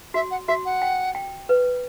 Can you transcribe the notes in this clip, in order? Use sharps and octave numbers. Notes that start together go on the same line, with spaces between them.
F#4 E5
F#5
F#4 E5
F#5
G5
G5
B4